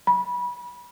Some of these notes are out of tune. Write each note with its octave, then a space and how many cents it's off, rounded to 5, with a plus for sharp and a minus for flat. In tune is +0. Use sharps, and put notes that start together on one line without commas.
B5 -25